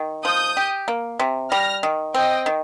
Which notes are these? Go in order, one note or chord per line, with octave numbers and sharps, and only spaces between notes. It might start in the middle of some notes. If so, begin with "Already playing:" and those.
Already playing: D#3
F3 D#6 G6
G4
A#3
C3
G3 F6 A#6
D#3
C4 D#5 G5
D#3